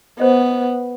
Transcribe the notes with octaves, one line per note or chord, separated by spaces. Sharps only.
B3 C5 D#5